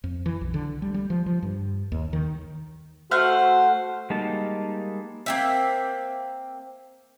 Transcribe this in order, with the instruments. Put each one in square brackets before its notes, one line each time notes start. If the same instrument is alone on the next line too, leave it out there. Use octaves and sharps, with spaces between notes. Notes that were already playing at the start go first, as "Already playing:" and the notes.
[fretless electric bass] F2
E3
B1
D3
G3
G3
F3
F3
G2
D#2
D#3
[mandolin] A3 F#5 F6 [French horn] F#4 [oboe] C5
[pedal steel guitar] G3 G#3 A#3 D#4 A5
[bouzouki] A#3 C4 E5